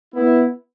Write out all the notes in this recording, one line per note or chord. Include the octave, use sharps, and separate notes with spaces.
B3 E4